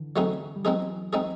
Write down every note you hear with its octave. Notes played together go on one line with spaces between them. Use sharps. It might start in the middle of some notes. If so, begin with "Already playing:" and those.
Already playing: D3 E3
F#3 A3 C4 D#4 G#4
G3
E3 F#3 G#3 C4 D#4 G#4
G#3 C4 D#4 G#4